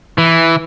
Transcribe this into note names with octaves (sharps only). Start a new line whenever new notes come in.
E3